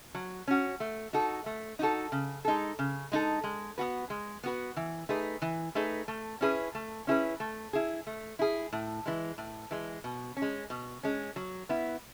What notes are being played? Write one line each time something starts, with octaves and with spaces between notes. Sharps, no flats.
F#3
C#4 F#4
A3
D#4 F#4 A4
A3
D#4 F#4 A4
C#3
G#3 D#4 A4
C#3
G#3 D#4 A4
G#3
B3 F#4 B4
G#3
B3 F#4 B4
E3
A3 D#4 G#4 B4
E3
A3 D#4 G#4 B4
A3
C#4 E4 G#4 B4
A3
C#4 E4 G#4 B4
A3
E4 G#4
A3
E4 G#4
A2
E3 G#3
A2
E3 G#3
B2
C#4
G#3
B2
G#3 C#4
F#3
B3 E4